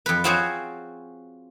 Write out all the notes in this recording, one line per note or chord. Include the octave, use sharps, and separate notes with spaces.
F2 B4
C4 F4 F#4 G#4 C5 C#5